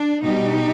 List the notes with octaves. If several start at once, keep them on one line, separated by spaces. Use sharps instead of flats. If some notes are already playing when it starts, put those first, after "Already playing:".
Already playing: D4
B2 G3 D#4 G4